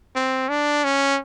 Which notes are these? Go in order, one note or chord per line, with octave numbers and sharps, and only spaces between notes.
C4
D4
C#4